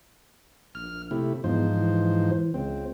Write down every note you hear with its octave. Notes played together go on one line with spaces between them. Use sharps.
A#1 F6
C3 A3 E4
E2 G#2 F3 C5
E3
C#2 C4